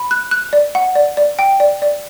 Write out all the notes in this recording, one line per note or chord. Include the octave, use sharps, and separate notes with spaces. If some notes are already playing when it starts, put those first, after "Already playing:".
Already playing: B5
F#6
F#6
D5
F#5
D5
D5
G5
D5
D5